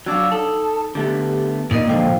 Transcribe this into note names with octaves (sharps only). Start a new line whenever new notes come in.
F#3 D4 F#4 F5 D6 E6
D#4 A4
D3 A3 B3 G4
A#2 D#4 A#4 D#5
G#2 D3 F3 C5 F5 G5